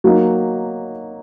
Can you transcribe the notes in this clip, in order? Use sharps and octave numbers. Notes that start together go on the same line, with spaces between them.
F#3 A#3 D#4